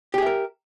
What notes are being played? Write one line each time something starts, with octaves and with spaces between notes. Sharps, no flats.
G4 G#4 A#4 E5